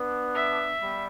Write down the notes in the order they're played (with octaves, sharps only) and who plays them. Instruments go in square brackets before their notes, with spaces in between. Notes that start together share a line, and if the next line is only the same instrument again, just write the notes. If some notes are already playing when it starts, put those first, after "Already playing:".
Already playing: [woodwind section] B3 D4
[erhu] E5
[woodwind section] G3 B3